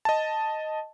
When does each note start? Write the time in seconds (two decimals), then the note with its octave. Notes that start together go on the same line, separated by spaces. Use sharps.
0.05 D#5 A5